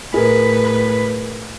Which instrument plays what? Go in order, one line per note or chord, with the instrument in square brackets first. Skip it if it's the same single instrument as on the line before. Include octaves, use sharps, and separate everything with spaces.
[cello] A2 B4 [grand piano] G#4 A#4